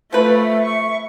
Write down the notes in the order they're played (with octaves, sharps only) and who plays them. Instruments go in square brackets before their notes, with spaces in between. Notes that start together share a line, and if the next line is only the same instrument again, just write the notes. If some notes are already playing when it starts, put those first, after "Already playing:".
[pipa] F3 B4 [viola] A3 [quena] E5
[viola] C#6